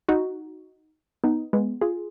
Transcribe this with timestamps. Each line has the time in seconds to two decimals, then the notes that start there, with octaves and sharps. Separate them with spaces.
0.08 D#4 F#4
1.24 B3 D#4
1.53 G#3 B3
1.81 F4 G#4